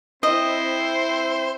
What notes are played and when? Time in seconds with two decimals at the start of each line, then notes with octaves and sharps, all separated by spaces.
0.23 C4 E4 C5 D#5